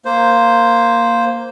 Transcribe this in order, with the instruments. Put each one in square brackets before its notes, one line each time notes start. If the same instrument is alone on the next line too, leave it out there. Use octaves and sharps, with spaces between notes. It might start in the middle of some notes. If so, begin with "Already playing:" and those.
[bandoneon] A#3 C5